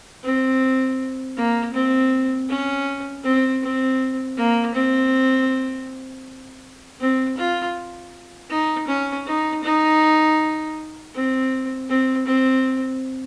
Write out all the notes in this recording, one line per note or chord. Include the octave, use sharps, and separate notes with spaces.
C4
A#3
C4
C#4
C4
C4
A#3
C4
C4
F4
D#4
C#4
D#4
D#4
C4
C4
C4